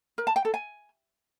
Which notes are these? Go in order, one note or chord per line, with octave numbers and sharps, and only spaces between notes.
A#4
A5
G5
A4
G#5